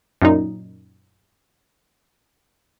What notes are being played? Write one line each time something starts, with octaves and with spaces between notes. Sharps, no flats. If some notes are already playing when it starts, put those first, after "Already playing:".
F#2 A#2 D#4